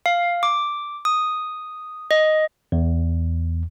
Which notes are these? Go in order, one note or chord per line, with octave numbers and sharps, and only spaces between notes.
F5
D6
D#6
D#5
E2